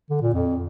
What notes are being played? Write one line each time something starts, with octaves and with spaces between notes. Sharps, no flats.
D3
A#2
F2